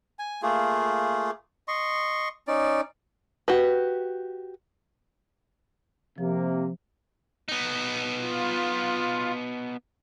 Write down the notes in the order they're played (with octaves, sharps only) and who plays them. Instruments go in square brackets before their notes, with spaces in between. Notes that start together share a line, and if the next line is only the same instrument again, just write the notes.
[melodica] G#5
A3 A#3 F4 G#4
D#5 C6 C#6
C#4 D#4 D5
[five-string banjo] F#4 G4 B4
[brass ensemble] C3 A#3 [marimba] F3
[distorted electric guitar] B3 D#4
[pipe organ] F4